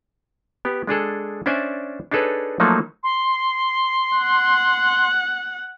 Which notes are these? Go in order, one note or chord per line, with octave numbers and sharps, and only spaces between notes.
B3 G4
G#3 D4 G#4 A4
C#4 D4 C5 D5 E5 G#5
D4 D#4 G#4 A4 B4 C#5
F3 F#3 A3 A#3 D#4 F#4
C6
F#5